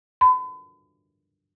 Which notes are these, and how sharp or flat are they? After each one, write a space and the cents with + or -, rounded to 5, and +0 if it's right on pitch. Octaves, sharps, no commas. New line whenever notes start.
B5 +40